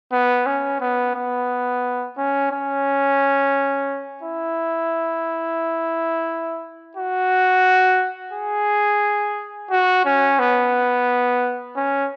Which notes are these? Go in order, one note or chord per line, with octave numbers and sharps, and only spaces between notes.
B3
C#4
B3
B3
C#4
C#4
E4
F#4
G#4
F#4
C#4
B3
C#4